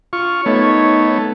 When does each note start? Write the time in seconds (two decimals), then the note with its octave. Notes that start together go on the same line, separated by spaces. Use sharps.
0.13 F4 C#6
0.46 A3 B3 D#4 C#5